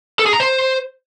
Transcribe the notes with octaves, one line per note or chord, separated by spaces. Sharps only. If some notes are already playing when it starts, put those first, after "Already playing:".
A4
G#4
A#5
C5